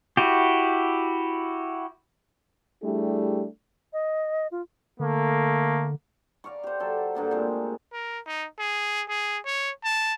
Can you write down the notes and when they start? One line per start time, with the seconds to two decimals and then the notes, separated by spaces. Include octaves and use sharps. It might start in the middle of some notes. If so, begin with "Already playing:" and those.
0.17 E4 F#4 G4
2.83 G3 A3 D4 E4 G4 G#4
3.93 D#5
4.51 F4
5.00 D3 A3 A#3
6.44 D5 F5 A#5 C#6
6.63 G4 C5
6.80 F#3 A4
7.15 G2 D3 A#3
7.31 A#2 G#3 A3 C4
7.93 A#4
8.26 D#4
8.59 G#4
9.09 G#4
9.45 C#5
9.84 A5